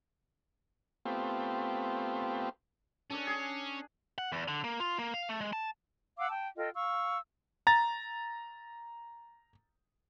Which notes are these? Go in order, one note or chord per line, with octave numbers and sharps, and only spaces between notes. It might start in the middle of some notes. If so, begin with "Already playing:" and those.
A3 B3 C4 F4 G4
C#4 D4 A4
G#4
F#5
E2
D3
A#3
F4
A#3
F5
A3
G#3
A5
F5 F#5 D6 E6
G5 A5
F4 A4 D#5 G5
F5 C#6 E6
A#5 A6